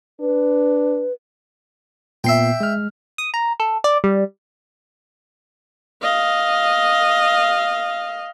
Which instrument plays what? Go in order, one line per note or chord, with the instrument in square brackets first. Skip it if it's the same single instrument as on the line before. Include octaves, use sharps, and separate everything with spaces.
[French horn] D4 [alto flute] B4
[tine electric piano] A#2 B3 C7 [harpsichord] E5 G5
[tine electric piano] G#3 F6
[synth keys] D#6
A#5
A4
D5
G3
[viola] D#5 F5